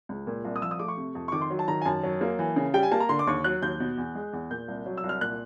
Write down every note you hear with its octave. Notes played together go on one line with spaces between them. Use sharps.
C#2
A#2
C2
D#6
F3 E6
D#6
A3 D6
C#6
C3
F2
C#6
D#3 D6
C6
F#3
A5
D#3 A#5
G#5
F#2 A5
F#3
A#3
E3
C#3
G3 G5
G#5
A#3 A5
A#5
D3 C6
D6
D#2 C#6
F#3 F#6
D#2 G6
B2
E2
G#3
E2
A#2 G6
C2
F#3
E6
C2
F6
A#2 F#6